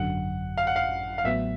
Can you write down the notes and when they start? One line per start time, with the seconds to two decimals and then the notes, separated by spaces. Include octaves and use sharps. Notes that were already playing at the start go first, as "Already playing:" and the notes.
Already playing: G#1 F#2 D3 F#3 F#5
0.57 F5
0.67 F#5
0.76 F5
1.18 F5
1.24 A1 A2 F#3 B3 E5